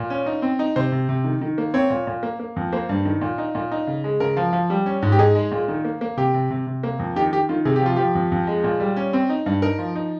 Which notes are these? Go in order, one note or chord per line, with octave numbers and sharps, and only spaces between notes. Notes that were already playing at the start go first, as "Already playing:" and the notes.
Already playing: A#2
C#4
D#4
C4
D#4
C3 C5
C3
C3
D#3
D#3
A#3
C4 C#5
A#2
A#2
A#3
A#3
F2
A#3 C5
G2
D#3
A#2
D#4
A#2
D#4
C#3
G#3
C#3 A#4
F3
F3
G3
C#4
G#2
G4
D#4 G#4
G#3
A#2
D#3
A#3
A#3
C3 G4
C3
C3
C3
A#3
F2
D#3 G4
D#3 G4
D#3 F4
C3 G#4
G4
F3 F4
F3 G4
F2
F2
G#3
A#2
G3
C#4
C4
D#4
G2
D#4 A#4
F3
D#4